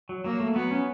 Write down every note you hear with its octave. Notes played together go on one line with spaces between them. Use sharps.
F#3
F#3 A#3
A3
F#3 B3
C#4